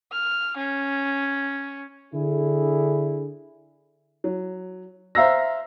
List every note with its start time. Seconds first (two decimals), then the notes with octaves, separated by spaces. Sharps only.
0.12 F6
0.57 C#4
2.14 D3 E4 G#4
4.24 F#3
5.15 C5 E5 F5 A#5 E6 A#6